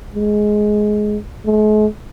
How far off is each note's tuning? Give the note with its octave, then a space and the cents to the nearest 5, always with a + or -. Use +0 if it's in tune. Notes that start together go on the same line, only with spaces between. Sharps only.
G#3 +15
G#3 +45